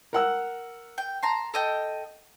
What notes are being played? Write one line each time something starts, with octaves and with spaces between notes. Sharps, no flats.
A#4 F#5 E6
G5
A5 A#5 C6
A4 D#5 G5